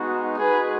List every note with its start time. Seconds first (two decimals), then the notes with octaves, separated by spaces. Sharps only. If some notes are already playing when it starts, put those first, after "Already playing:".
Already playing: G#3 B3 D#4 F#4
0.39 G#3 D#4 F#4 G#4 B4